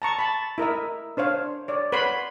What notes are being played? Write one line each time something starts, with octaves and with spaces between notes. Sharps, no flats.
A5 A#5 C#6
A5 B5
E4 A#4 D#5 E5
D4 C5 C#5 F5
C#5 D5
B4 C#5 F#5 B5 C6